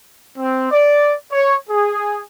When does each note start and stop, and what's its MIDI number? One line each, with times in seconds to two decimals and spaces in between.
0.38 0.68 60
0.71 1.15 74
1.32 1.56 73
1.70 2.22 68